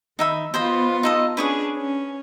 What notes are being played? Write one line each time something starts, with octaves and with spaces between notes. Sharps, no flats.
D#3 D#4 E5 B5
B3 F4 C5 D#5 B5
D#4 A4 D#5
C#4 D4 G#4 B4 C#6 D#6
C#4